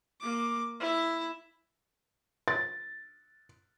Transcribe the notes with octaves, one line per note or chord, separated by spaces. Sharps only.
A#3 D6
E4 E5
A6